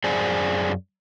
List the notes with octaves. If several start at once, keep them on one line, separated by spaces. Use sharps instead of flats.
F#2 G#4 C5 D5 G#5